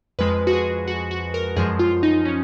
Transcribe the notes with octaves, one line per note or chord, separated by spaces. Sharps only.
F2 F3 G#3 B4
F#4
G#4
F#4
F#4
A#4
F#2 F3 G#3 G#4
F4
D#4
C#4